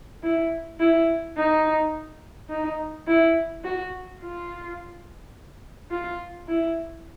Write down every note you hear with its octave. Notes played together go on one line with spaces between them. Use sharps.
E4
E4
D#4
D#4
E4
F#4
F4
F4
E4